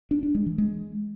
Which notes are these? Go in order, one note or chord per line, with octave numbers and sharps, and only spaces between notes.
D4
D4
G#3
E3
G#3